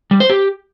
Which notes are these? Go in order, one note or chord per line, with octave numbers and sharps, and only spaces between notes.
G3
C5
G4